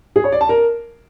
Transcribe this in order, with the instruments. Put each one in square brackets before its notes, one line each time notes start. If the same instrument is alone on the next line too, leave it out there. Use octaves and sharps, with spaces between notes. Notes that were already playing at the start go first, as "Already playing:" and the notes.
[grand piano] G#4
C#5
D5
A5
A#4